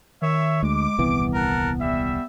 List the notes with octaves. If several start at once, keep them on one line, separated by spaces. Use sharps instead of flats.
D#3 C#5 E5
D2 G#3 D6
D#1 C2 E3 B3
A#4 F#5 A5
G3 E5